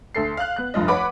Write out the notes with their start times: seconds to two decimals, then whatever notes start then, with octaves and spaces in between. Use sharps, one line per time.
0.15 D2 A4 C7
0.37 F5 F#6
0.56 B3 F#6
0.74 F1 G2 F4 D#5
0.88 B4 C#5 F#5 B5 D6